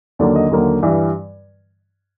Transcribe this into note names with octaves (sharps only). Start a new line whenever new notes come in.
D#2 D3 F#3 A#3 D5
D#5
D#2 D3 F#3 A#3
G2 E3 G3